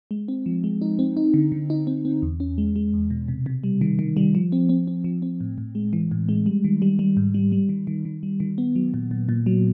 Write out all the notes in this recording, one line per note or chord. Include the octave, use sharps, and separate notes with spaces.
G#3
C4
F3
G#3
D#4
C4
D#4
D3
D3
D#4
C4
C4
E2
C#4
G#3
G#3
E2
B2
C3
C3
G3
D#3
D#3
G3
F3
C4
C4
C4
F3
C4
A2
A2
G#3
E3
A2
G#3
G3
D#3
G3
G3
G#2
G3
G3
D#3
D#3
D#3
G3
D#3
B3
F#3
A#2
A#2
A#2
F#3